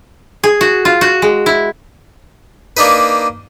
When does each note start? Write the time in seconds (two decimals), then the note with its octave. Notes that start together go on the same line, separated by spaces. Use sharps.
0.44 G#4
0.61 F#4
0.85 F4
1.01 F#4
1.22 G#3
1.46 E4
2.77 A#3 D4 D#4 B4